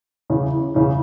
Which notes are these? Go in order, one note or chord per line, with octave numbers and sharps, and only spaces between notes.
E2 C#3 E3
E2 C#3 E3